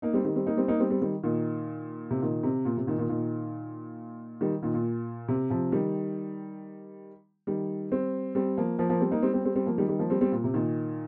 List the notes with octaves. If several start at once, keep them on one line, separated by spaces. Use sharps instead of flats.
A#3 D#4
G3 C4
D#3 G3
G3 C4
A#3 D#4
G3 C4
A#3 D#4
G3 C4
G3 C4
D#3 G3
A#2 D#3
C3
A#2 D#3
C3
A#2
C3
A#2 D#3
A#2 D#3
A#2 D#3
D#3 G3
A#2 D#3
A#2
C3
C3 F3
D#3 G3
D#3 G3
G3 C4
G3 C4
F3 A#3
F3 A#3
F3 A#3
G3 C4
A#3 D#4
G3 C4
G3 C4
G3 C4
G3 C4
F3 A#3
D#3 G3
D#3 G3
F3 A#3
G3 C4
G3 C4
A#2
C3
A#2 D#3